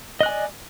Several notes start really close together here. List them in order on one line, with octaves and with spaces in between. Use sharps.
D#5 F#6 G#5 D5